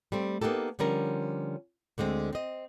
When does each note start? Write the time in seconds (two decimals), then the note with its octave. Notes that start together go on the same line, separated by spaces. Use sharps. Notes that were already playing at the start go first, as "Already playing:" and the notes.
0.12 G3 A3 C4
0.41 A#3 B3 D#4 G4 A4
0.79 D3 F3 G3 C#4 A#4
1.98 D2 D3 G#3 C4
2.33 C4 D#5